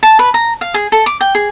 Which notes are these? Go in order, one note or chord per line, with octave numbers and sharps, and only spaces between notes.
A5
B4
A#5
F5
G#4
A4
D6
G5
G#4